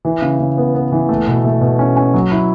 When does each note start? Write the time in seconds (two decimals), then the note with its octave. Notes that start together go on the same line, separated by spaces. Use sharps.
0.05 E3
0.22 C#3
0.40 C#3
0.57 B3
0.75 B3
0.92 E3
1.09 A3
1.27 B2
1.45 A3
1.61 B2
1.79 C#4
1.96 C#4
2.14 F#3
2.31 E4